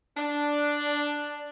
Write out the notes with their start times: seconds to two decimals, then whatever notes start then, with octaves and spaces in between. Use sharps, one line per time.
0.17 D4